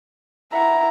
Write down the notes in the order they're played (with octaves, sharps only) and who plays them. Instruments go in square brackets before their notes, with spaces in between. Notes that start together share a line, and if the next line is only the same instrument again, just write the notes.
[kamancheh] E4 A#5 [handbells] E5 F#5